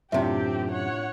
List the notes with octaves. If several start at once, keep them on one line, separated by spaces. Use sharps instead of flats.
F#2 A2 C3 C4 D4 F4 G4 E5
C#5 F#5